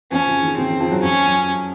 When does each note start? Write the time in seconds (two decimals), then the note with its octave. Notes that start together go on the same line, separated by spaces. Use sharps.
0.12 F2 F3 C#4
0.27 C#3
0.43 D#3
0.57 C#3 C4
0.68 D#3
0.80 F2 F3
0.91 F#2 F#3
1.02 F2 F3 C#4
1.25 F#2 F#3